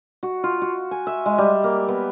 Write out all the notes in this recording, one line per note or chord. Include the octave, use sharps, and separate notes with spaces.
F#4
F4
F#4
G#5
E5
G#3
G3
A#3
B3